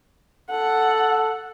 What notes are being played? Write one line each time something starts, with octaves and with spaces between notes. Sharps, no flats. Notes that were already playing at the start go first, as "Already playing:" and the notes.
A4 F#5